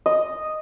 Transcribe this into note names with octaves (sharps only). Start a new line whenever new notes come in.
D#5